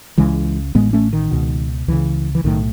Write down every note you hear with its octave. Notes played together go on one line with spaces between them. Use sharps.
C#2 C#3 E3 G#3
A1 A2 G#3 B3
A3 C#4
D#3
C#2 B2
C#2 C#3 E3
E3
B1 A2 D#3